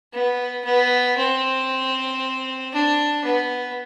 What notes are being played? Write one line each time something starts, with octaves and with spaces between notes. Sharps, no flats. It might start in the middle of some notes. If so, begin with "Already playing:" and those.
B3
B3
C4
D4
B3